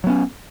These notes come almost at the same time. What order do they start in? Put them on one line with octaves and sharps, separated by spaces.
F#3 B3 C#4